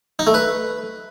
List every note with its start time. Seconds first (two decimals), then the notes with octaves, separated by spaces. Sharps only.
0.19 D#4
0.27 A3
0.34 B4